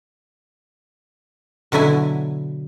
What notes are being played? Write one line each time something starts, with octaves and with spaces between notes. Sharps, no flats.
B2 D3 F#3 E4 G#5